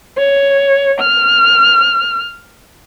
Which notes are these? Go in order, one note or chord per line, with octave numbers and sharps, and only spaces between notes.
C#5
F6